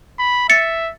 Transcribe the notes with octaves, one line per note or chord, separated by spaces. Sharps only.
B5
E5 A6 C#7